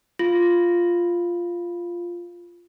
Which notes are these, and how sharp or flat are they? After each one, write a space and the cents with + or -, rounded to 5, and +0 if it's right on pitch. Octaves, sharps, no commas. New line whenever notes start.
F4 -5